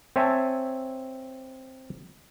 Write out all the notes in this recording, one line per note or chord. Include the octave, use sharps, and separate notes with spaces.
C4 C#5 E5 G#5 A5